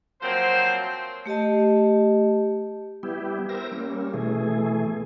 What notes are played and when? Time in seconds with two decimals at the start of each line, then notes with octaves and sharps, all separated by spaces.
0.22 F3 F#3 A#3 C4 C5
1.26 A3 G4 D#5 A5
3.03 G3 B3 E4 G4
3.49 A#4 C5 E5 A#6
3.72 G3 A#3 C#4
4.14 B2 E3 A3 G#4